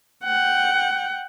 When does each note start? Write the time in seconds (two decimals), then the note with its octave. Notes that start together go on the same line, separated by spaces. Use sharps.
0.25 F#5 G5